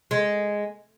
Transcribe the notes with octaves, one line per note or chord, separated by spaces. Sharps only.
G#3